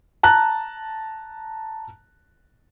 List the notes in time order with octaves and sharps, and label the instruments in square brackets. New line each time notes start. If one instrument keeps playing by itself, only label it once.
[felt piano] A5 A#5 F#6